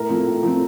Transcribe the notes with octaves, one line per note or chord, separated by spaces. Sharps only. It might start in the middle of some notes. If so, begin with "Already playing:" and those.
Already playing: A2 A#4
F3 A3 C4
A2
F3 A3 C4